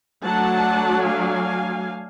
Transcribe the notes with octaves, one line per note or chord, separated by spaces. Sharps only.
F#3 A3 D4 F#5 A5
F5 G#5